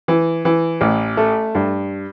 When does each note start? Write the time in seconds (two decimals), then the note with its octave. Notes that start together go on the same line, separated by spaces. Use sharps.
0.08 E3
0.45 E3
0.81 A1
1.17 A3
1.55 G2